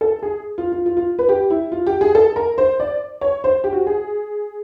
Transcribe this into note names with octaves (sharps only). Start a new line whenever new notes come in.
A4
G#4
F4
F4
F4
F4
B4
G4
E4
F4
G4
G#4
A4
A#4
C5
D5
C#5
C5
G4
F#4
G#4